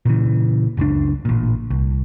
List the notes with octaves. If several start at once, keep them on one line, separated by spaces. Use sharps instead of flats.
A#2 C#3 E3
F#1 C#2 D4
A1 A#2
C2